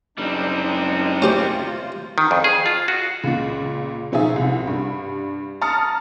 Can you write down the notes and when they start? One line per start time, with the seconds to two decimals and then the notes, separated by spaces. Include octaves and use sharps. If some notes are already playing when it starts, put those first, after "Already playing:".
0.18 F#1 G3 G#3 C4 D4 D#4
1.22 C3 C#4 F4 G4 C5
2.18 D#3
2.31 F2
2.44 G#4
2.66 F4
2.88 F#4
3.24 C#2 A#2
4.12 B2 F3 D#4 F4 G#4 E5
4.36 C2
4.67 G2
5.61 A5 A#5 D#6 F6 C#7